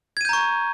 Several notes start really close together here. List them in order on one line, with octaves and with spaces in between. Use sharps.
G#6 D#7 G6 A#5 C#6